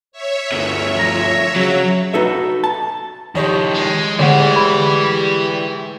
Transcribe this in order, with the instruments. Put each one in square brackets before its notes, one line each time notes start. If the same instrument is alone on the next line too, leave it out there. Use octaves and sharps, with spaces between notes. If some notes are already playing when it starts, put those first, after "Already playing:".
[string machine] C#5 E5
[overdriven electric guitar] D2 G2
[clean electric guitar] F3 A#5
[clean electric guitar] C#3 [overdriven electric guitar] F#3
[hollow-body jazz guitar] D#4 F#4 A4 B4 E5
A5
[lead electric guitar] D#3 F3 [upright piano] G4 C#5 D#5
[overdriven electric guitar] G#3
[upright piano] A2 G#3 [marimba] D3 F#5 [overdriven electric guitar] E3 [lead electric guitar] G4 D5
[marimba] B5